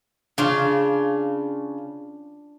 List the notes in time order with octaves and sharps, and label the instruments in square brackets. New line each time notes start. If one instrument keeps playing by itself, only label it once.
[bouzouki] C#3 [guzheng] D4 F4